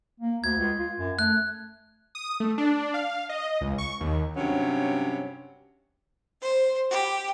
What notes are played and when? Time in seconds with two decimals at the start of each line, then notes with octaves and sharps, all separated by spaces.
0.20 A#3
0.44 D2 G#6
0.58 C#2
0.79 F4
0.99 F#2
1.19 A3 F#6
2.15 D#6
2.40 A3
2.58 D4
2.94 F5
3.29 D#5
3.61 C#2
3.78 C#6
4.01 D#2
4.36 G2 C3 F#3 C#4
6.42 C5
6.90 G4